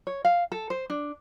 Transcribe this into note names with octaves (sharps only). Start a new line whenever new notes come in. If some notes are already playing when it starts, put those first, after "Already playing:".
C#5
F5
A4
C5
D4